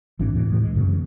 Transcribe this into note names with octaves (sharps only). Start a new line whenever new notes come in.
G#1 E3 C4 D4
D#2 A2 E3
A2 E3
G#3
F#2 C#3 E3 B3